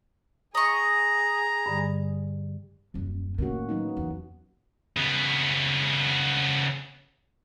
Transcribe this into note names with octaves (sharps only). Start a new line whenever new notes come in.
G#4 D#5 A#5 C#6
G2 D3 G3
D#1 F#2
A2 D#3 A#3 C#4 F#4
F#3 B3 D#4
E2
C#3 B3